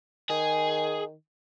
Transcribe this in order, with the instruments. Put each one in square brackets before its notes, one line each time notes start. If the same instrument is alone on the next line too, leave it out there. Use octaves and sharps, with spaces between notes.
[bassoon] D#3 [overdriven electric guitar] G#4